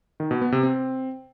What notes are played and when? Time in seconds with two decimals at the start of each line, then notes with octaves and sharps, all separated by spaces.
0.20 D#3
0.31 B2
0.42 B3
0.52 C3
0.63 C4